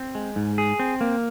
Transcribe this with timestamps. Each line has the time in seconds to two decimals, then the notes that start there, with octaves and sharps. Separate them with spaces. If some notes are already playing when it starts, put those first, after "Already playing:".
Already playing: C4
0.15 G#3
0.36 G#2
0.58 G#4
0.79 C4
1.01 A#3